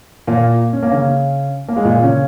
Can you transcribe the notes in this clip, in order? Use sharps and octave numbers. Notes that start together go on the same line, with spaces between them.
A#2 A#3
C#4
A#3
C#3 C#4
A#3
G#3
A#2 A#3
C#3 C#4